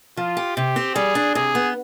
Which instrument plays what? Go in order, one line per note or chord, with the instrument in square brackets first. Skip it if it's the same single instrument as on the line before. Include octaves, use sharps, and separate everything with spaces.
[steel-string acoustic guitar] F3 [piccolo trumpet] F4
[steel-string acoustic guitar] G4
[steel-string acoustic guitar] C3 [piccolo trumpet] G4
[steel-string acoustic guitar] C4
[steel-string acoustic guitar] G3 [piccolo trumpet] G#4
[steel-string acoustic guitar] D4
[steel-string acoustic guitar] C3 [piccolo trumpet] G#4
[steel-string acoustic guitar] B3